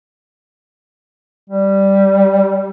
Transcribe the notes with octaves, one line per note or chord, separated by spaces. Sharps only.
G3